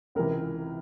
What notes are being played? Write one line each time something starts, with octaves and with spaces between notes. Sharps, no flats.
C#2 C3 E3 A#4